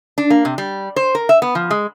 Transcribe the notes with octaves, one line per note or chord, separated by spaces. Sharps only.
D4
A#3
C3
G3
C5
A#4
E5
B3
F3
G#3